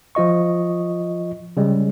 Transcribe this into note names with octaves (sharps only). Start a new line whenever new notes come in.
F3 F4 D#5 C#6
C#3 G3 G#3